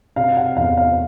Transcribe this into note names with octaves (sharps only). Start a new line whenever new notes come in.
C3 F5
F#5
E2 F5
F5